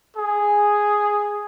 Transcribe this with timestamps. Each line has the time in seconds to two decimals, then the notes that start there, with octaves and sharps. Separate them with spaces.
0.17 G#4